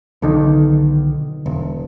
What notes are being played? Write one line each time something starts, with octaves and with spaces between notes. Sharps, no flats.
B1 D3 D#3
E1